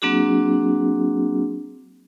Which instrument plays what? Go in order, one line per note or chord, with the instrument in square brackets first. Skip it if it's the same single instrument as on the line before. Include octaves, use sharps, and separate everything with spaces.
[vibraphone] F#3 A#3 C4 D4 F#4 G#4